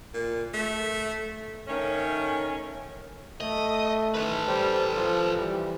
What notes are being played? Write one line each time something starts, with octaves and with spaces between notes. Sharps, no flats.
A#2
A3
D#3 A3 C#4
A3 D#5
D#3 A4 B4
G3 C5
F3 C5
E3 G3